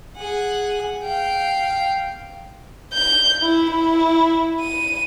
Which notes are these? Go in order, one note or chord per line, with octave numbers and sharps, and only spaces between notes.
G#4 F#5
F5 G5
G6
E4
E4
D#7